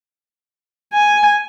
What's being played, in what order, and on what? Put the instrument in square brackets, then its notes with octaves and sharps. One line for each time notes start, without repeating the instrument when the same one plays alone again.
[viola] G#5